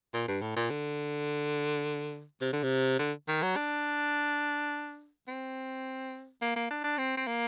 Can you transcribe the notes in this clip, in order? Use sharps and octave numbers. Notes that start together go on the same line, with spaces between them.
A#2
G2
A2
A#2
D3
C3
D3
C3
D3
D#3
F#3
D4
C4
A#3
A#3
D4
D4
C4
C4
A#3